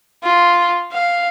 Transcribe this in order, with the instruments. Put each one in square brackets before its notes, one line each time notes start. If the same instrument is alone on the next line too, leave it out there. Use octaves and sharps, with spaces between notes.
[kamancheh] F4
F5